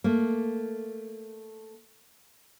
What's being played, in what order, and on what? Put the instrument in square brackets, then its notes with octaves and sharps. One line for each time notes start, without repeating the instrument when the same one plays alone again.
[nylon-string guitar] A3 A#3